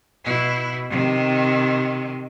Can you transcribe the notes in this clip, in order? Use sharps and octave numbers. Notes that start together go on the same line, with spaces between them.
B2 E4
C3 D#3